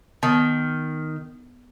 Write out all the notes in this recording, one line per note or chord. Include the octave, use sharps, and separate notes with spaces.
D#3 B3